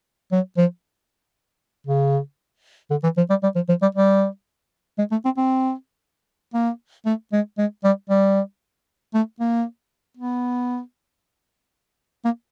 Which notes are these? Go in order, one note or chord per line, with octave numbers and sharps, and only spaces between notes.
F#3
F3
C#3
D3
E3
F3
G3
G3
F3
F3
G3
G3
G#3
A3
C4
C4
A#3
A3
G#3
G#3
G3
G3
A3
A#3
B3
A#3